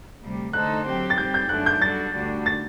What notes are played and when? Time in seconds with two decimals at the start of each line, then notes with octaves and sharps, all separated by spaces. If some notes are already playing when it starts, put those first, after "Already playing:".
0.22 D2 C3 G3
0.53 D3 A3 D#4 A4 C5 F#6
0.86 F#3 C4 G4
1.10 A6
1.18 G3 C4 G4 G6
1.34 G6
1.49 F#2 D3 F#3 A3 D4 F#6
1.66 G6
1.81 G3 D4 F#4 A4 A6
2.13 D2 D3 G3 D4 F#4
2.46 A6